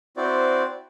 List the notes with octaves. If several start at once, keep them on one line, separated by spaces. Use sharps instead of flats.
C4 E4 F#4 C5 D5